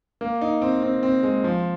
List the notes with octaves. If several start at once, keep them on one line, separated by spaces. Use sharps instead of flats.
A#3
D#4
C4
C4
C4
G#3
F3